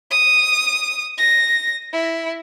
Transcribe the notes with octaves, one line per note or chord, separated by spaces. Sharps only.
D#6
A#6
E4